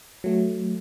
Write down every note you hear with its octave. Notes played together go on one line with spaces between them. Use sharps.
F#3 A3